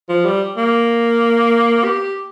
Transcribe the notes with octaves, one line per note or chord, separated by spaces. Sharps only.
F3
G3
A#3
G4